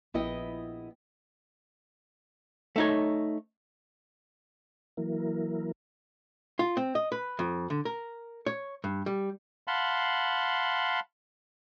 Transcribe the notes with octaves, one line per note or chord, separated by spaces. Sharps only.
A#1 B3 E4 D#5 G5 D#6
A3 D#4 C#5
E3 F#3 A#3 E4 A#4
F4
C4
D#5
B4
F2
D3
A#4
C#5
G2
G3
F5 F#5 A5 B5 C6